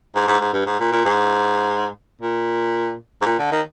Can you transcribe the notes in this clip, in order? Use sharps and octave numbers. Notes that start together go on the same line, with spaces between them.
G#2
G#2
G#2
G2
G#2
A#2
A#2
G#2
A#2
G#2
A#2
D3
D#3